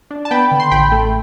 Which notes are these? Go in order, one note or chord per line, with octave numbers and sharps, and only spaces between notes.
D4
A5
B3 G5 B5
D3
C6
A1 G5 B5
A3